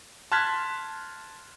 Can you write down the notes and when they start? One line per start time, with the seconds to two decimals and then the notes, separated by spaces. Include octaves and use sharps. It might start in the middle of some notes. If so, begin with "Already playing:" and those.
0.32 A5 C6 F6 F#6 G#6 B6